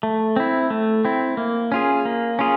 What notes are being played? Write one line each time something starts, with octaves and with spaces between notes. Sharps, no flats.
A3
C4 E4
A3
C4 E4
A#3
C#4 F4 G#4
A#3
C#4 F4 G#4